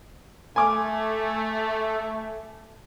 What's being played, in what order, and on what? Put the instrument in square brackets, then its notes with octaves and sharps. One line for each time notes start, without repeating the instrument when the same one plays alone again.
[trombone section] A3 [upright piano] G#5 D6